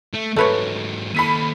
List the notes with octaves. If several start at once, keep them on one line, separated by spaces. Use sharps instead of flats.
A3
G#2 F#3 A3 B4 C#5
D#2 A4 B5 B6 D#7